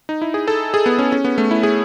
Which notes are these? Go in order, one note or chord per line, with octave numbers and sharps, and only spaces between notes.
D#4
E4
G#4
A4
G#4
B3
C#4
C#4
B3
A3
E4
G#4